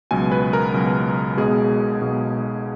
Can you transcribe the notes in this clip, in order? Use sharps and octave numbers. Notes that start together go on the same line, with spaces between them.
C#2 B2 F#3 G#5
B4
A#4
C#2 B2 F#3
B1 B2 G#3 G#4
B1 B2 G#3